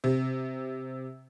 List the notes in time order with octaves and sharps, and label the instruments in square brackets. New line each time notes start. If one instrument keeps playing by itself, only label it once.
[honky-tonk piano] C3